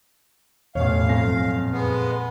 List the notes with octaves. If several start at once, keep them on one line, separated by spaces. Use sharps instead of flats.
A1 E2 B2 C#5 F5
F2 G#5 A#6
F#2
A#2
G#3 B3